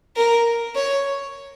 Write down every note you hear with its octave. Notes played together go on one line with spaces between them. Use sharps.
A#4
C#5